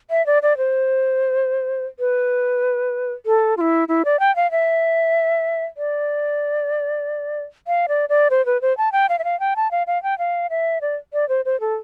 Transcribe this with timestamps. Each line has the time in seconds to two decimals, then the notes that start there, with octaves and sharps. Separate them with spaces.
0.10 E5
0.26 D5
0.43 D5
0.58 C5
1.99 B4
3.26 A4
3.57 F4
3.61 E4
3.88 E4
4.05 D5
4.20 G5
4.36 F5
4.51 E5
5.77 D5
7.67 F5
7.89 D5
8.09 D5
8.30 C5
8.46 B4
8.62 C5
8.78 A5
8.92 G5
9.09 F5
9.19 E5
9.24 F5
9.40 G5
9.56 A5
9.71 F5
9.87 F5
10.03 G5
10.18 F5
10.50 E5
10.81 D5
11.13 D5
11.29 C5
11.45 C5
11.60 A4